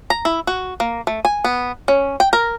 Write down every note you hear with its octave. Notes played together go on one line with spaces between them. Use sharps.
A#5
E4
F#4
A#3
A3
G#5
B3
C#4
G5
A#4